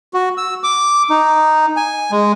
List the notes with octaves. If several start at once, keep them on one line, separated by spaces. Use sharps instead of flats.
F#4
E6
D6
D#4
G#5
G#3